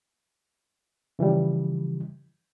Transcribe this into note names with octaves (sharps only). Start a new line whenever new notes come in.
C#3 E3 F3 G3